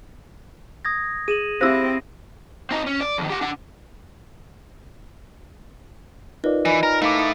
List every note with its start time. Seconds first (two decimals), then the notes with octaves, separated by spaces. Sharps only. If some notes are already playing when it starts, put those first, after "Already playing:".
0.85 D#6 G#6 A#6
1.28 G#4 D#7 E7 F#7
1.61 C4 E4 G4 C5 F5 E6 A#6
2.71 C4 D#4
2.86 C#4
3.01 D5
3.18 F2 D#3
3.30 G4 F#5
3.41 D4 F#5
6.44 D#4 F4 A#4 B4 D5 D#5
6.65 E3 D#5 G#5 B5
6.83 A#4 A#5
7.02 A3 D#4 E4 F5 D6
7.17 C#6 D#6